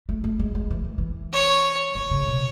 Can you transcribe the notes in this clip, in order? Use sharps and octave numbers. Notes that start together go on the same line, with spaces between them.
A3
A3
G#3
G#3
E3
D#3
E3
C#5
D#3 C#5
C#3
B2